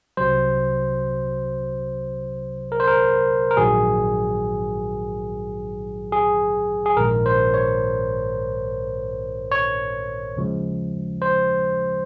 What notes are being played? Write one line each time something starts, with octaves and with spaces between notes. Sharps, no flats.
C2 C3 F#3 C5
A#4
C5
A#4
A#4
A#1 G#2 D#3 F#3 G#4
G#4
G#4
A#1 G#2 D#3 A#4
C5
C#5
C#5
D#2 C#3 F3 G#3
C5